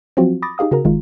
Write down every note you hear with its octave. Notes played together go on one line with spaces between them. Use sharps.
F3 F#3 C4 F4 F#4
B5 D6 D#6 A6 A#6
D#4 G4 G#4 F5 D#6
C#3 F#4 G#4 A#4 A#5
G1 D#3 G#3 F4